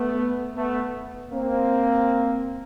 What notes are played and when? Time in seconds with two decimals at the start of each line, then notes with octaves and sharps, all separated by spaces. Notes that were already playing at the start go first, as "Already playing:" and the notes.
Already playing: A3 B3
0.56 A3 B3
1.32 A#3 C4